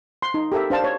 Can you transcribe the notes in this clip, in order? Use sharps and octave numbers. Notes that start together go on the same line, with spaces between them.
C6
D#4
G4 A4 A#4 E5
D4 C5 F5 A5
C#5